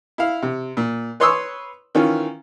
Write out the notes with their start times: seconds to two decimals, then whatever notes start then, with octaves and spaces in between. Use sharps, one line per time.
0.18 E4 F5
0.42 C3
0.77 A#2
1.20 B4 C#5 C6 C#6 D#6 E6
1.95 D#3 E3 C#4 F4